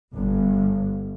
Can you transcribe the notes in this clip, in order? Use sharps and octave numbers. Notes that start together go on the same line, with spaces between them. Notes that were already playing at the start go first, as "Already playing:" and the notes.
G1